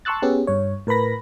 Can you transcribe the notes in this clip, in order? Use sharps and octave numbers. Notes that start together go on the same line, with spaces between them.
A5 C6 C#6 E6 F#6 A6
B3 C#4 G4 G#4
G2 C#5
A2 A#4 B4 B5 A#6